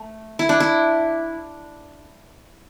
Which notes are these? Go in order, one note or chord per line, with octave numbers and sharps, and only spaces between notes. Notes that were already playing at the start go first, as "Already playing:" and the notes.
Already playing: A3
E4
D4
E4